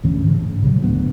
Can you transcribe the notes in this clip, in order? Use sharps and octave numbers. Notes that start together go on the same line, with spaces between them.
D2 G#2 E3 C#4
C#3
G#2
A#2 C#3 F3 F#3
D1 D2 B3